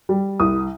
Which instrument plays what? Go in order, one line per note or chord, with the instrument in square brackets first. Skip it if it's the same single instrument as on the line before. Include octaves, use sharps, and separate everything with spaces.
[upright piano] G3
C2 D#6